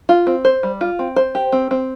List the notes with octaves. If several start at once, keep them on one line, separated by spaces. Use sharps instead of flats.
F4
C4
C5
G3
F4
C4
C5
G4
C4
C4